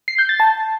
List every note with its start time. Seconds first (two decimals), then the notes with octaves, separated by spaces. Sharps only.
0.08 C7
0.18 G6
0.29 A6
0.40 A5